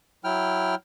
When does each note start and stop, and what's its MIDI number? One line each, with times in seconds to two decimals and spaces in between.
0.24 0.75 54
0.24 0.75 64
0.24 0.75 79
0.24 0.75 89